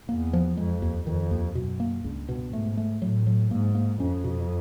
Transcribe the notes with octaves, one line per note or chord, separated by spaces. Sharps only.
E2 A#3
F3
F2 G#3
D#2
F2 D#3
D#2
F#2 B2
A#3
C#2 G2
B2
G#2 A3
A3
A2 F#3
F#3
G#2 A#3
A#3
F2 C#4
B2